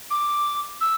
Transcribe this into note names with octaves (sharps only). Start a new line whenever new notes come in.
D6
E6